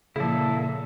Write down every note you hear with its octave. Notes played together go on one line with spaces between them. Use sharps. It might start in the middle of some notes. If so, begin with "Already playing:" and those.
A#2 C#3 F3 E4 G#4 A4